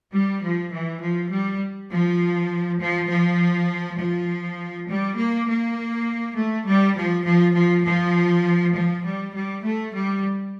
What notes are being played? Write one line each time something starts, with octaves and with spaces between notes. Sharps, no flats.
G3
F3
E3
F3
G3
F3
F3
F3
F3
G3
A#3
A#3
A3
G3
F3
F3
F3
F3
F3
G3
G3
A3
G3